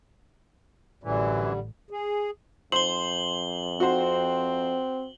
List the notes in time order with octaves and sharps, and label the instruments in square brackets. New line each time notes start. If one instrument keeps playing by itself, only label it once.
[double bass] A1 [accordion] F#2 E3 [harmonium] D3 G3
[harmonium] G#4
[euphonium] F2 [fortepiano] C5 [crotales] F#7 G7
[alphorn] C4 [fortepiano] F#4 C5